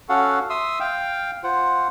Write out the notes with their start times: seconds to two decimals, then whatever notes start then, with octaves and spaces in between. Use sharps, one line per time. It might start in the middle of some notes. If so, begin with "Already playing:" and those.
0.09 C#4 F#4 A4 F5 F#5
0.50 E5 C6 D#6 E6
0.80 F5 G5
1.44 F4 C5 F#5